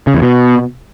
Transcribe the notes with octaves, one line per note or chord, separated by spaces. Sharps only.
C#3
E2
B2